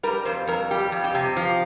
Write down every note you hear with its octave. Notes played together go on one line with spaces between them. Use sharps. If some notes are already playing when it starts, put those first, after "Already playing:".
G3 A#4
F2 C5
F2 A#4
G3 G4
F2
G4
C3
F3